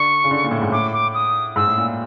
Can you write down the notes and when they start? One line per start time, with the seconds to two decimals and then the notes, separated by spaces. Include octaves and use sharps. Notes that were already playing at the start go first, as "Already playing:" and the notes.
Already playing: D3 C#6
0.24 C#3
0.31 D3
0.44 A#2
0.51 A2
0.62 G#2
0.72 A2 D6
0.93 D6
1.14 D#6
1.56 G#2 E6
1.67 A2
1.78 A#2